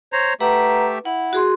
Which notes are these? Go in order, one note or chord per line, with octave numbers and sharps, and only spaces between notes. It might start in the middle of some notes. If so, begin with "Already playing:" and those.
C5 C#5 A#5
A3 G4 B4 E5 F#5 A#5
E4 F#5
F#4 G#4 C6